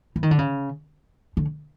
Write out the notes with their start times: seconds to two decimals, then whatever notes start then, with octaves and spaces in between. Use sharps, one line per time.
0.16 E3
0.23 D#3
0.31 D3
0.38 C#3
1.37 D3